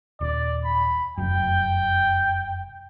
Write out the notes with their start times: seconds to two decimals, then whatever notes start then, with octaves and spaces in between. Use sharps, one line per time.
0.21 D#1 D5
0.65 B5
1.18 F1 F#2 G5